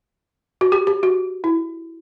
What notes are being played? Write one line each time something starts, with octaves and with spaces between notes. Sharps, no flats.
F#4
G4
G4
F#4
E4